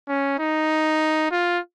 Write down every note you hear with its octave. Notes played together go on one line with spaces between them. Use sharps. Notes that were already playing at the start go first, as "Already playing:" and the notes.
C#4
D#4
F4